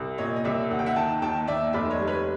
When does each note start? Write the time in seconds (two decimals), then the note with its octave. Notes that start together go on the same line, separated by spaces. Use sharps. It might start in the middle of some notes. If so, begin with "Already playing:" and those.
Already playing: C2
0.18 A#2 C#5 D#5
0.36 D#5
0.44 C2 D5 E5
0.70 D#2 F#5
0.79 G5
0.86 E5 F#5
0.96 D#3 G5 A5
1.22 D#2 G5 A5
1.47 D#2 D5 E5
1.73 F1 D5 E5
1.90 C#5 D#5
2.00 G3
2.08 B4 C#5